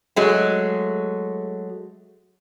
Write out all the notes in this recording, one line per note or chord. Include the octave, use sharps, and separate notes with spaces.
F#3 G#3 A3